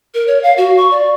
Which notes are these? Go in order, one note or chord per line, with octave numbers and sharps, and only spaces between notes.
A#4
C#5
F5
F#4
C#6
D5